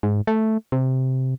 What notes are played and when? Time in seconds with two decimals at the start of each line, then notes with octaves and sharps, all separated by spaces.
0.03 G#2
0.27 A3
0.72 C3